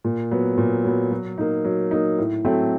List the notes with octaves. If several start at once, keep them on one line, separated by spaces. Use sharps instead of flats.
A#2
F#3 B3
A#2
F#3 B3
F#3
A#3 D#4
F#3
A#3 D#4
A2
F#3 A3 C4 E4